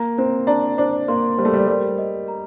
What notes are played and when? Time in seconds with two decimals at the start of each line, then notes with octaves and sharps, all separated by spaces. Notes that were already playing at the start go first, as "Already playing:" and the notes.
Already playing: A#3 A#5
0.18 C4 C5
0.47 D4 A#5
0.78 D4 C5
1.08 A#3 C6
1.38 G3 C5
1.45 A3
1.53 G3
1.67 G3 A#4
1.98 D#5
2.28 A#5